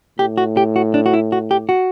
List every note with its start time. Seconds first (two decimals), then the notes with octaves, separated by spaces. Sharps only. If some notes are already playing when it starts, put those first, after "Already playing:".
0.19 A2 G4
0.38 F#4
0.57 G4
0.76 F#4
0.94 D4
1.06 F#4
1.13 E4
1.32 F#4
1.51 G4
1.69 F#4